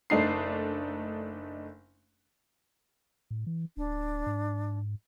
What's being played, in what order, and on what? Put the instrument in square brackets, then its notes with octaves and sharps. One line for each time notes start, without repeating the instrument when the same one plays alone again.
[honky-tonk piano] F#1 A3 D4 D#4 C7
[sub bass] A2
E3
[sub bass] D1 [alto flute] D4
[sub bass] G#2